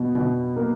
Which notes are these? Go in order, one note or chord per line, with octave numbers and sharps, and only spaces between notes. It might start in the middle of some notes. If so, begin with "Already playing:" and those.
Already playing: B2
B2
A#3